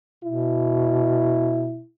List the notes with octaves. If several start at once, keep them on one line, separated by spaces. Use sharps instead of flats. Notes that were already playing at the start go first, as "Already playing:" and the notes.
B2 E4